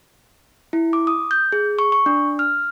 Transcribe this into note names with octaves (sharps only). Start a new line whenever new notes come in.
E4
D6
D#6
G6
G#4
C#6
C#6
D4
F6